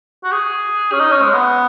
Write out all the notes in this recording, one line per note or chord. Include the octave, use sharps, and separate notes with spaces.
F#4
G#4
C#4
D#4
C#4
G#3
B3